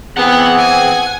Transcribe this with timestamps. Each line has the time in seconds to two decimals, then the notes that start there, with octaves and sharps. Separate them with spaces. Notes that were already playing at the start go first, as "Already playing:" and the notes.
0.17 E3 B3 C4 G#4 F#5
0.58 G#5